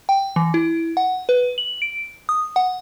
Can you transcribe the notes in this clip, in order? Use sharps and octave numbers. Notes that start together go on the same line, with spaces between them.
G5
E3
E4
F#5
B4
F#7
D7
D#6
F#5